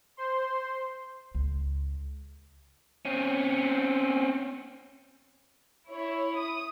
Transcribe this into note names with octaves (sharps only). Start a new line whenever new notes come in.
C5 C6
C#2
C4 C#4
E4 C#5
D#6